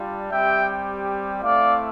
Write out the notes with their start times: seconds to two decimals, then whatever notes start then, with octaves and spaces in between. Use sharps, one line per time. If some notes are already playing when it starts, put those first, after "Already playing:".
Already playing: G3 D4 F4
0.32 G3 C4 G4 E5 G5
1.42 A3 C4 E4 D5 F5